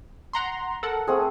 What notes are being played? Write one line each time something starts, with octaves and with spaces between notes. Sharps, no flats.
F#5 A#5 C6
A4 A#4 F#5
A3 C4 G#4